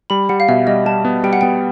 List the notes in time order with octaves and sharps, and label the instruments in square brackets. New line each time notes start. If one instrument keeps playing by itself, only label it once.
[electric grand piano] G3 [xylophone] B5
[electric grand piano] G3 [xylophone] F#5
[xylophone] F5
[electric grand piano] B2 [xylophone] E5
[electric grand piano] G3 [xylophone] D#5
[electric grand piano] G3 [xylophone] A5
[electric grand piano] B3
[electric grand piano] G3 [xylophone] G5
[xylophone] F#5
[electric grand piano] B3 [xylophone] G5